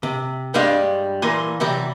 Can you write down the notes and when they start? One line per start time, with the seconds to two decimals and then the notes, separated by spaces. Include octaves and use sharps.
0.03 C3
0.54 G2 G3 G#3 D4 F5
1.22 A#2 E3 A#3 G#5 C6
1.60 C3 E3 F#3 G3